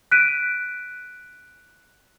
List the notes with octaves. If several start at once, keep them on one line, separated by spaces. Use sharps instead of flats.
F#6 B6 D7 D#7